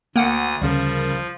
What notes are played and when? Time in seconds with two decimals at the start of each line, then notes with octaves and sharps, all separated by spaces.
0.16 D2 A#3 F#5 D#6 D7
0.62 D2 C#3 F3 G3 C#4 A#4